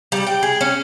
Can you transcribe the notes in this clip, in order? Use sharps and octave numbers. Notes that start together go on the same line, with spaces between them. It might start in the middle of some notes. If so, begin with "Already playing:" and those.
G3
G5
G#4
C#4